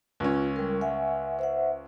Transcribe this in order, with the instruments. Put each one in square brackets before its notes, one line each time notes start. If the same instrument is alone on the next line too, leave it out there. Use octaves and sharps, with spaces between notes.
[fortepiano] C#2 C#4 [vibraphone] F4
[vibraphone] G3 A#4
E5 F#5 G#5
C5 E5 F#5